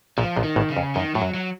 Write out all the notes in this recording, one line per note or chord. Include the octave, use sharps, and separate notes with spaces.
A#1 A#2 F3
A#1 A#2
D#3
A1 A2
C#3
F2
F#2 D#3
A2 F#3
F#2
F#3